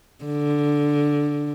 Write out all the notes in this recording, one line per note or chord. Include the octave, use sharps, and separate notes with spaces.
D3